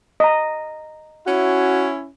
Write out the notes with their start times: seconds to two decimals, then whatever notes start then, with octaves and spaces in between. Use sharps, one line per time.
0.20 D#5 A#5
1.26 C#4 E4 F#4